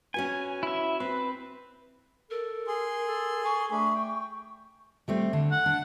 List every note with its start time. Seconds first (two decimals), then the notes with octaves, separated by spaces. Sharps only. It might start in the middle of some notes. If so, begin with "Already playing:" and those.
0.14 C#4 F#4 B4 G#5
0.63 E4 E5
1.00 C4 B4
2.31 A4 A#4
2.67 G#4 C6
3.07 A4
3.45 G#5 C#6
3.72 A3 D4 G#4 B5
3.95 G5
5.08 G3 A3 C4
5.33 D3
5.51 F#5
5.66 D4